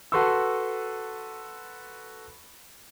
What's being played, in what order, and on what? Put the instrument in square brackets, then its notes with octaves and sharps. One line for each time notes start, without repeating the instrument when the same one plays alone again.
[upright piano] F#4 A4 B4 C6 C#6 E6